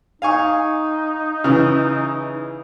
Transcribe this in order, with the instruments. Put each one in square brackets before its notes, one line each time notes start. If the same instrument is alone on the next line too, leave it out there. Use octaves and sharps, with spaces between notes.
[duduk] D#4 [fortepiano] F5 G#5 C#6
[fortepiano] C#3 E3